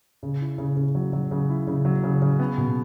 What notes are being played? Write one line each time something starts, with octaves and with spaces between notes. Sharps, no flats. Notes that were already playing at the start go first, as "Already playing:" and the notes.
C#3
E4
C#3
C#3
F#3
F#3
C#3
E4
C#3
F#3
C#3
C#3
B3
B2